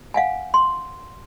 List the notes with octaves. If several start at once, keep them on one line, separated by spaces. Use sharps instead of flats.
F5 F#5 G#5
C6